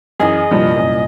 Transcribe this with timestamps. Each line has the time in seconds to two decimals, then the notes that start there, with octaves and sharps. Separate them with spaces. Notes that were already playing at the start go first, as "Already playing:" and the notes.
0.20 F#2 E3 G#4 D#5
0.51 C2 G2 A#2 F3
0.76 F#2